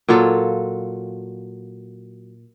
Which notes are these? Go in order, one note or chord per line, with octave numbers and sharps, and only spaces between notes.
A#2 F#3 F4 A4